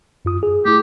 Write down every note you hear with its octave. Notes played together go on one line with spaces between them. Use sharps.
F#2 F4 D#6
G#4
A3 E4 G4